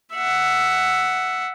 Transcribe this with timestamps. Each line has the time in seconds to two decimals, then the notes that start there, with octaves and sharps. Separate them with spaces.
0.14 E5 F#5